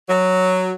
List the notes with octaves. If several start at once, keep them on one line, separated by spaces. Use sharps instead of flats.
F#3